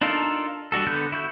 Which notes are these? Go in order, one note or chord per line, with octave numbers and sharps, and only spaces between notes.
D4 D#4 F4 A4 A#4
G3 D4 F#4 A4
D3 B3 A4 F#6 G6
E4 F#4 G6